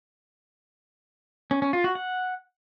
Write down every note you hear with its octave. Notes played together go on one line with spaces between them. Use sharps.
C#4
C#4
F4
F#4
F#5